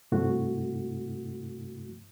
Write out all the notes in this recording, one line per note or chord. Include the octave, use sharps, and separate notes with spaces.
G2 C3 A3 E4 F#4